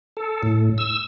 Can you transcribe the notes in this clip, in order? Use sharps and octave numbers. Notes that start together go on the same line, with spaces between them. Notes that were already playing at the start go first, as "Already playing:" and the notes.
A4
A2
E6